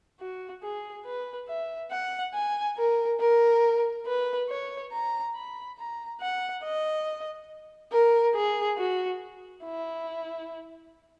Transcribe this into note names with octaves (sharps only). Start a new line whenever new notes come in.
F#4
G#4
B4
E5
F#5
G#5
A#4
A#4
B4
C#5
A#5
B5
A#5
F#5
D#5
A#4
G#4
F#4
E4